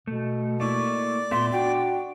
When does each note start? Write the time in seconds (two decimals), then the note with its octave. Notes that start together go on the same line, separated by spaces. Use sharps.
0.07 B2 A3
0.60 A3 A#3 E4 D5 C#6
1.31 A#2 A3 B3 E5 C6
1.52 D4 F#4 G5